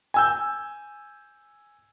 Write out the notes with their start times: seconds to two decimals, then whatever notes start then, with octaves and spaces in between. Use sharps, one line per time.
0.14 G#5 E6 G6